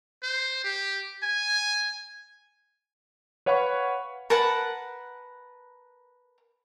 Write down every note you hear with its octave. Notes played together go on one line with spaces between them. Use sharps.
C5
G4
G#5
B4 C#5 F5 F#5 B5 C#6
A#4 B4 F#5 A5